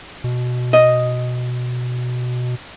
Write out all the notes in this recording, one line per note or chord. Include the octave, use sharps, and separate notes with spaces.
B2
D#5